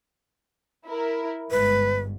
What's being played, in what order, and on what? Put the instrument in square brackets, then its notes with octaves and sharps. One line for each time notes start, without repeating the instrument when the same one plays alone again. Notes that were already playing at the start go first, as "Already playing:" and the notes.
[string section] E4 A#4
[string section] G1 G#2 [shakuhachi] B4